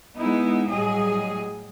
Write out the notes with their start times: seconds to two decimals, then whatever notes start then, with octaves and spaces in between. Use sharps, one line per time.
0.18 G#3 B3 D#4 E4
0.66 A2 F#3 G3 G#4 D#5